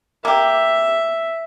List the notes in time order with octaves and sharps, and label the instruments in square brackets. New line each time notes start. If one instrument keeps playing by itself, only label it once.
[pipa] A#3 G4 [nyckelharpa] E5